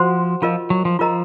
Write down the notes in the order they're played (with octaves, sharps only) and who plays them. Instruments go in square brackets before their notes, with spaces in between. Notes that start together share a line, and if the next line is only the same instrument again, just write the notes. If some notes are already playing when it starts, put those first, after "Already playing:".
Already playing: [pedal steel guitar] F3 [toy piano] F#4 C5 F#5 C6
[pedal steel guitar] F3 [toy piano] F4 A#4 D#5
[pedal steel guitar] F#3
F3
[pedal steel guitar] F3 [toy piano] F4 A#4 D#5 A#5